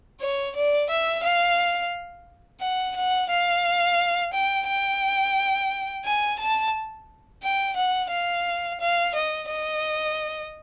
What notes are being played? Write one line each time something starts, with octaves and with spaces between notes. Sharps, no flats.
C#5
D5
E5
F5
F#5
F#5
F5
G5
G5
G#5
A5
G5
F#5
F5
F5
D#5
D#5